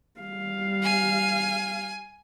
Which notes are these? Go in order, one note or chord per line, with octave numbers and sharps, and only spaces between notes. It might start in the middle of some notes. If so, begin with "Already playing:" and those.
G3 F5
G#5